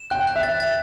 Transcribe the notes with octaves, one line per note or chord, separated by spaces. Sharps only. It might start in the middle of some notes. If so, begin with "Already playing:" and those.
Already playing: E7
G5 F#6
F#6
E5
A6
A6